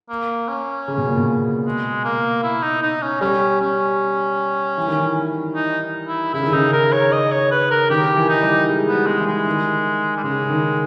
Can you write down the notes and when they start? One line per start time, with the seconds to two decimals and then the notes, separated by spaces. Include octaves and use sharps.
0.10 A#3
0.48 C#4
0.88 C#3
0.98 B2
1.07 A#2
1.17 B2
1.65 G#3
2.05 A#3
2.43 E4
2.63 D#4
2.82 D#4
3.02 C#4
3.21 G3 C#4
3.61 C#4
4.78 E3
4.88 D#3
4.98 E3
5.55 D#4
6.08 E4
6.34 C#3 E4
6.43 D#3
6.52 C#3 D#4
6.73 A#4
6.93 C#5
7.12 D#5
7.32 C#5
7.51 B4
7.71 A#4
7.90 D#3 G4
8.16 E3
8.29 D#4
8.42 G3
8.68 G#3
8.88 B3
8.94 G3
9.07 G#3
9.20 E3
9.27 G#3
9.46 D#3
10.17 G3
10.24 C#3 G#3
10.50 D#3